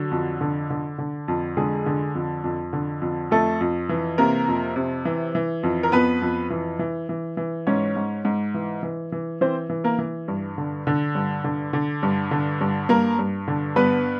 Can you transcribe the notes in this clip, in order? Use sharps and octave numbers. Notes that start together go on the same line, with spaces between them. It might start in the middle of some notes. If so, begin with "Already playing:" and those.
Already playing: D3 F#3 F#4
F2
D3
D3
D3
F2
D3 G#3 G#4
D3
F2
F2
D3
F2
F2 A3 A4
F2
E3
C3 A#3 A#4
F2
C3
E3
E3
F2
A#4
F2 B3 B4
F2
E3
E3
E3
E3
G#2 C#4 C#5
G#2
G#2
E3
E3
E3
E3 C4 C5
E3
A#3 A#4
E3
G2
D3
D3
G2
D3
D3
G2
D3
G2
G2 A#3 A#4
G2
D3
G2 B3 B4